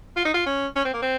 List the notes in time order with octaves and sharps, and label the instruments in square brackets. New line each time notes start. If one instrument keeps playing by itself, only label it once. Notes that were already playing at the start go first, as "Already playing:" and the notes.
[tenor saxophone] F4
D#4
F4
C#4
C#4
C4
A#3
C4